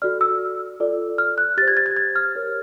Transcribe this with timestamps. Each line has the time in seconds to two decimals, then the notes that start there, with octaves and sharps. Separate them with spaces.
0.02 F#4 A4 D5 F6
0.21 E6
0.80 F4 A4 D5
1.18 F6
1.38 F#6
1.57 G4 A6
1.62 C5
1.68 G#6
1.77 A6
1.86 G#6
1.97 G#6
2.16 F6
2.35 G4 A#4 C#5